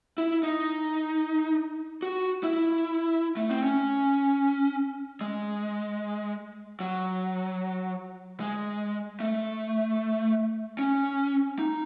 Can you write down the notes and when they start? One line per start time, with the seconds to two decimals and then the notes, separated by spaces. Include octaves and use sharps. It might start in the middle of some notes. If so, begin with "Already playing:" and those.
0.18 E4
0.43 D#4
2.02 F#4
2.43 E4
3.37 A3
3.50 C4
3.63 C#4
5.21 G#3
6.80 F#3
8.40 G#3
9.20 A3
10.79 C#4
11.59 D#4